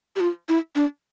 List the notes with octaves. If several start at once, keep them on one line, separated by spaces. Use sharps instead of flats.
G4
F4
E4
D4